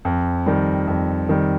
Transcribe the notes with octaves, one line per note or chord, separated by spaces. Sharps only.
F2
D#3 G3
F2
D#3 G3